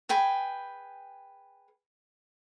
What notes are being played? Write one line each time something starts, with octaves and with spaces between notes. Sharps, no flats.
G#4 B4 G5 G#5